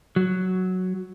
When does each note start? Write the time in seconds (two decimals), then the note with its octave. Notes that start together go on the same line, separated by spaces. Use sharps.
0.16 F#3